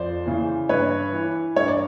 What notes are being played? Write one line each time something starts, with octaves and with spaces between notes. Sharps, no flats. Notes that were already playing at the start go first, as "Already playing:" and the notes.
Already playing: F2 C5 D5
C#3 E3
G2 B4 C#5
E3
G2 C#5
D5